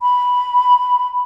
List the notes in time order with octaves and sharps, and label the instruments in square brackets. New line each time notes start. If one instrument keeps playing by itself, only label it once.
[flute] B5